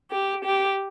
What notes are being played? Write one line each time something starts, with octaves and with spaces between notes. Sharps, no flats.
G4
G4